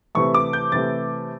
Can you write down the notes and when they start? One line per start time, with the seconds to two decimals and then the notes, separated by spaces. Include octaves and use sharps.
0.15 C3 E3 A3 C#6
0.34 D6
0.53 G6
0.72 C3 E3 A3 A6